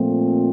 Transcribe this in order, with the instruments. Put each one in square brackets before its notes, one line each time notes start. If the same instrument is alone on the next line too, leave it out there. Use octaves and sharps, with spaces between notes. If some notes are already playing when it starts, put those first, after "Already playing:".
Already playing: [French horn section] A#2 F3 A3 C4